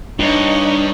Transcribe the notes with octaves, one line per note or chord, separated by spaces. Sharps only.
G2 D4 D#4 B4 C#5 D#5